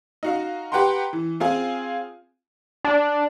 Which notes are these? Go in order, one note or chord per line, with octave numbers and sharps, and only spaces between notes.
D#4 F#4 F5
G4 B4 F#5 G5 A#5 C6
E3
C4 F4 G#4 G#5
D4